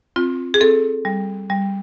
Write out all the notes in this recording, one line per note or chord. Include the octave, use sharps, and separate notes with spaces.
C4 F4
G#4
C4 A4
G3
G3